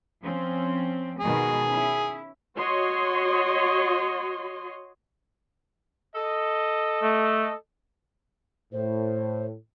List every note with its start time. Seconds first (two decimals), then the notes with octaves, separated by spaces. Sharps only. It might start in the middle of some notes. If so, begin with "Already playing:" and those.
0.23 F3 C4 C#4
1.20 B2 D#3 G#3 G#4
1.66 C#4 E4
2.58 F#4 C#5 D#5 C6
6.15 A4 D#5
7.03 A3
8.73 A2 C5